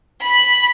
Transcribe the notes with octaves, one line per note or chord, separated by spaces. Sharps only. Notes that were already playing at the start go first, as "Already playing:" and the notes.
B5